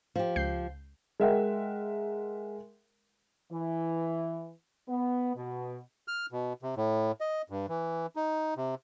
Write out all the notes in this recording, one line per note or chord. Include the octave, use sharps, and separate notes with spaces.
F3 G4
C#2 G6 C7
G#3 A#4 E5 F#5 G5
E3
B3
B2
F6
B2
C3
A2
D#5
G2
E3
D#4
C3